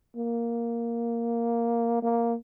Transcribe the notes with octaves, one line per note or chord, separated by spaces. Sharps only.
A#3
A#3